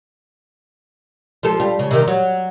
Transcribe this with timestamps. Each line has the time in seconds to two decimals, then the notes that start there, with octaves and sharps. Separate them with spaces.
1.43 F3 A4
1.60 G3 F4
1.79 C#3
1.91 C3 D#3
2.08 F#3